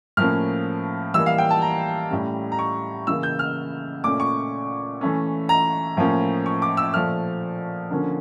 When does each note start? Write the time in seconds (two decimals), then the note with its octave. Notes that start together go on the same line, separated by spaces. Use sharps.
0.17 A2 F3 A#3 C#4 F6
1.14 E3 G3 A#3 E6
1.26 F5
1.38 G5
1.51 A5
1.62 A#5
2.10 A2 G3 C#4
2.52 A#5
2.59 C#6
3.07 C#3 E3 A#3 E6
3.23 G6
3.39 F6
4.04 A#2 A3 C#4 D6
4.20 C#6
5.01 E3 A3 C#4
5.49 A#5
5.97 A2 F3 A#3 C#4
6.46 C#6
6.62 D6
6.77 E6
6.94 A#2 F3 A3 F6
7.91 D3 F3 A#3 C#4